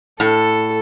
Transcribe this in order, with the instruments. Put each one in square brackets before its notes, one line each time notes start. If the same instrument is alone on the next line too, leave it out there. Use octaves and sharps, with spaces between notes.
[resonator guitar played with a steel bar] A2 [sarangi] A4